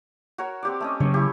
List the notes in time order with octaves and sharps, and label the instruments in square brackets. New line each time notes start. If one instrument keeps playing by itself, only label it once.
[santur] F#4 A#4 C#5
C4 G4 D5
A3 C#4 D#5
[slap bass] C#3 F#3 A#3 [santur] C#5
[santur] E4 G4